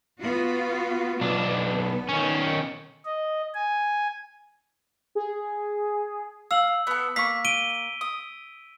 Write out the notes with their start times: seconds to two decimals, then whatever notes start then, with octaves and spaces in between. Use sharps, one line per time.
0.21 B3 F4 F#4
1.21 B1 B3 D4
2.09 D#3 C#4
3.05 D#5
3.54 G#5
5.15 G#4
6.51 F5 E6 F#7
6.87 B3 A4
7.16 A#3 C#6 B6
7.45 D7 D#7 G7
8.01 D#6